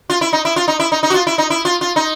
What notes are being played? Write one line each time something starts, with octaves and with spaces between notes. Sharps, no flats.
F4
E4
D#4
E4
F4
D#4
E4
D#4
D#4
F#4
F4
E4
D#4
E4
F4
F4
D#4